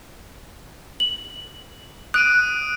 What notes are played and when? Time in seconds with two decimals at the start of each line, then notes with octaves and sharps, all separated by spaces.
1.00 F#7
2.14 D#6 F#6 D7 D#7